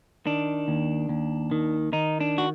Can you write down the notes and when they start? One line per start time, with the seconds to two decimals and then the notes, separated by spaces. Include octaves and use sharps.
0.26 D#3 D4
0.68 D#2
1.09 D#2
1.51 D#3
1.93 D#3 D#4
2.21 D4
2.38 F#4